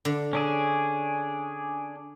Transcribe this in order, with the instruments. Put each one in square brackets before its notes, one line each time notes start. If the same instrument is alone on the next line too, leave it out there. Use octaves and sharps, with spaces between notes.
[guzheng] D3
[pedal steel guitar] C#4 D4 G#4